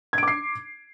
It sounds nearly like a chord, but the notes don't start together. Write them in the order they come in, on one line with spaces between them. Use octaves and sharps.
G#6 D7 D6 C7